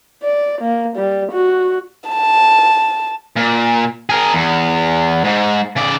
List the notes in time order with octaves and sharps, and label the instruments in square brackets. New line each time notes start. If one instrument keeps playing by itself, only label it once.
[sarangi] D5
A#3
G3
F#4
[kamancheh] A5
[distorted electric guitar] A#2
G#4 A#4
E2
G#2
C#3 D5